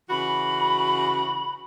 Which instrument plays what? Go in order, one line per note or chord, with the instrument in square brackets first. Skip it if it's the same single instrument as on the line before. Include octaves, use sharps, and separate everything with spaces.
[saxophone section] C#3 E3 F#4 [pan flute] B5